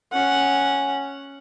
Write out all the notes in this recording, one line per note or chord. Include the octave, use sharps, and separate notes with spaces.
C#4 F#5